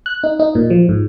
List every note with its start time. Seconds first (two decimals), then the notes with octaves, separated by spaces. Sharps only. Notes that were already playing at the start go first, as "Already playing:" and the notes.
0.06 F#6
0.24 D#4
0.39 D#4
0.55 A#2
0.70 F3
0.89 G#2